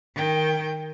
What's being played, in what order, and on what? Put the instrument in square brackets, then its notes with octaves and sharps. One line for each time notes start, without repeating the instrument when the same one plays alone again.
[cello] D#3 G5